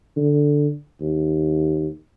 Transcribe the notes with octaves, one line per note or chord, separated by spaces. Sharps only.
D3
D#2